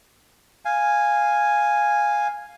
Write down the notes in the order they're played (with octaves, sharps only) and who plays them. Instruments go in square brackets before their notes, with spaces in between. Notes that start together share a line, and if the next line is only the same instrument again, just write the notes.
[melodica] F5 G#5